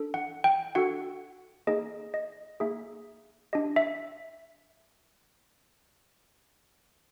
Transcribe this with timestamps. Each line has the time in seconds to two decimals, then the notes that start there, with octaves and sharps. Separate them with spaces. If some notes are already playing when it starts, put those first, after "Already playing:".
Already playing: D4 A4
0.14 F#5
0.44 G5
0.75 D4 F#4 A4 F#5
1.67 A#3 D#4 G#4 D#5
2.14 D#5
2.60 A#3 D#4 G#4 E5
3.53 D4 G4 D#5
3.76 E5